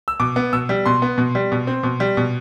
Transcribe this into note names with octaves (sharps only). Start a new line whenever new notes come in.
E6
B2 D6
B3
B2 E6
G3
B2 C6
B3
B2
G3
B2
C4
B2
G3
B2